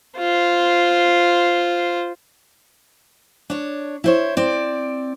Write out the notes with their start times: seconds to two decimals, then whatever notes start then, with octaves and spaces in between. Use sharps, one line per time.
0.19 F4 C5
3.50 D4 C#5
4.04 E4 C5 C#5
4.37 C4 D5